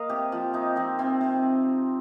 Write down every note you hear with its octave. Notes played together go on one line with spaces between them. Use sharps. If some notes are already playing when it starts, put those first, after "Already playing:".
Already playing: A#3 A#4 D#5 F5
C3 G4
F3 F4
C3 D#4
F3 C4
C3 C4
C3